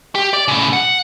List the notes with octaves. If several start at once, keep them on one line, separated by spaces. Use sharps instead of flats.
G4
D5
A2 C#3
F#5